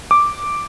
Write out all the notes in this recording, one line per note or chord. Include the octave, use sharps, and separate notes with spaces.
D6